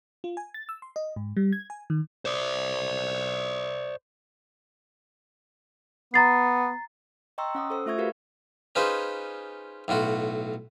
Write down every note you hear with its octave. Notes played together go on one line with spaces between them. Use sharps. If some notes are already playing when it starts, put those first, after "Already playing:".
F4
G#5
A6
E6
C6
D#5
G#2
G3
G#6
G#5
D#3
C5 D5
B3 A#5 A6 C7
D#5 G5 A#5 C6 C#6 E6
C#4 F#5 D#6
A4 C5 E6
A3 F4 E5 C#6 G#6
F#4 G4 A#4 B4 F5
C#4 D#4 F4 G#4 B4 C5
B1 A2 F4 F#4